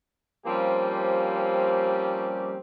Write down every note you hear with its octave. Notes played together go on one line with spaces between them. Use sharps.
F3 G3 A#3 C4 C#4 G4